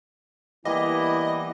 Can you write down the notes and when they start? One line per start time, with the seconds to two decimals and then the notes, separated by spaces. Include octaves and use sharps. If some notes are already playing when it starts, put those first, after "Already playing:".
0.65 E3 G3 A#3 B3 E4 D#5